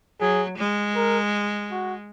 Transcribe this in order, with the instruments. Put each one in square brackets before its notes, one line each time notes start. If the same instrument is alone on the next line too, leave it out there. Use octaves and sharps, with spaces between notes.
[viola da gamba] F#3 [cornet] G#4
[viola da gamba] G#3
[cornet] A#4
F#4